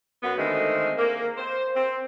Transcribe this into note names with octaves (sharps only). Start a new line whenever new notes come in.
F#2 B3
D3 D#3 G#3 A3 C4
A#3
C5
C4